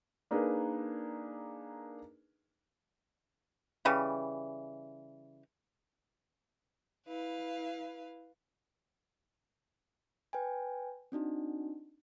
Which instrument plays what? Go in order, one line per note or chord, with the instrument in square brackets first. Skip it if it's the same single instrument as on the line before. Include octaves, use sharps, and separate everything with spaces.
[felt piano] A#3 D4 D#4 G#4 A#4 B4
[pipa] C#3 E3 G3
[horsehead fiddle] E4 [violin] B4 F5
[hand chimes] B4 G5 G#5
C4 D4 D#4 F#4